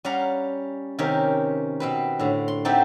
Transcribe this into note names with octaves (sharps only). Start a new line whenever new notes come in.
G3 C#4 G4 F5 F#5 A#5
C3 D#3 C#4 G4 A#4
B2 C4 B4
A2 D3
C6
A3 C4 D#4 F#4 G4 A4